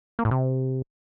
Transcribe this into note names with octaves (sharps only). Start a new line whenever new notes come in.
A#3
A2
C3